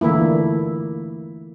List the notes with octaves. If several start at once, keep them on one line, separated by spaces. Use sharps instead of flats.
D3 E3 A3 A#3 E4